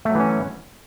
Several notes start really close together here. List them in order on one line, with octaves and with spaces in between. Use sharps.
A3 F#3 E3 C#4